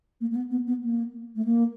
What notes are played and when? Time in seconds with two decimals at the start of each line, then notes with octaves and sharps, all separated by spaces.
0.21 A#3
0.31 A#3
0.35 B3
0.51 B3
0.67 B3
0.83 A#3
1.36 A3
1.45 A#3